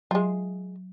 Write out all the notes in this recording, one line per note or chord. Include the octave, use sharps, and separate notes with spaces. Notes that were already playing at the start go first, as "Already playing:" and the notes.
F#3 G#3 F4